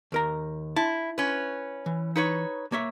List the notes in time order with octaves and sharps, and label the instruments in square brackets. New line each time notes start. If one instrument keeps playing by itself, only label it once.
[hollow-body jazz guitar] D#2 A#4 A#5
[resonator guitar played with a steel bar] E4 [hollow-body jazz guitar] A5
[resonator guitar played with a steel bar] C#4 B4
[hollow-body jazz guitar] E3
[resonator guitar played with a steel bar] D#4 B4 C#5
[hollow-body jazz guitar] A#3 C#5 E5